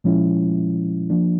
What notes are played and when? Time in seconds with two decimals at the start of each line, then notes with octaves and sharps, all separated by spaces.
0.04 A#2 F3 G#3 C#4 E4
1.10 F3 A#3 D4